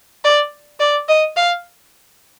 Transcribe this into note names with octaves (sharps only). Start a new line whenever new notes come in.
D5
D5
D#5
F5